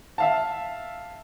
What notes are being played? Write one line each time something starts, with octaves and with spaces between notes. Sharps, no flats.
E5 F5 A5